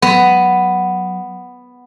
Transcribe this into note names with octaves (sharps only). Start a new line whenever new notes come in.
F#3 B3